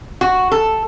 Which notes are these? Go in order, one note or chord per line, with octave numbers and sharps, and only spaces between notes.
F#4
A4